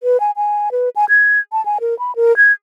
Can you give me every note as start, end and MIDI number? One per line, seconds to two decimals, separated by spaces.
0.03 0.20 71
0.20 0.31 80
0.36 0.69 80
0.72 0.89 71
0.96 1.05 80
1.09 1.39 92
1.52 1.64 81
1.66 1.78 80
1.81 1.97 70
1.99 2.15 83
2.16 2.36 70
2.37 2.52 92